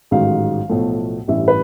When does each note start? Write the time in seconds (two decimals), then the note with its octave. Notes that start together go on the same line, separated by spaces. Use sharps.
0.11 A1 G#2 D#3 F#3 F5
0.69 B1 A2 F3 A3
1.28 A1 G2 E3 E5
1.48 B4